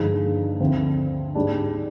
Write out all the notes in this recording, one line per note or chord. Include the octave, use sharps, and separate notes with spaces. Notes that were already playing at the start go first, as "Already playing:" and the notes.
Already playing: G2 D3 F3 G#3 D#4
D2 D3 F3 C4
G#2 G3 D4